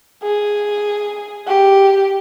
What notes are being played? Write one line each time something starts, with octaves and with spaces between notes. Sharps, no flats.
G#4
G4